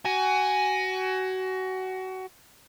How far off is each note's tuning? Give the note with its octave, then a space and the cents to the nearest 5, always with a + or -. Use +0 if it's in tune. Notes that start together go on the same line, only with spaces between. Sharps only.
F#4 +25 G#5 +0